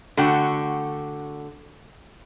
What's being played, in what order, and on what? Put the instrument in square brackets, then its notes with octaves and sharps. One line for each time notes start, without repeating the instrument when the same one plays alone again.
[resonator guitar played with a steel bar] D3 A3 F#4 G5